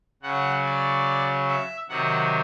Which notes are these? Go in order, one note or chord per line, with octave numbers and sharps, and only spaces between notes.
C#3 F#3 F#5
D5
E5
C3 D#3 F#3 F#5